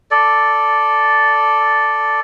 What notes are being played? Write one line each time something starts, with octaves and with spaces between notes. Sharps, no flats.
A4 D5